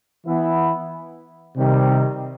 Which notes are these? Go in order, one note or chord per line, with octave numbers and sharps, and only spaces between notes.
E3 B3 E4
C3 D#3 G3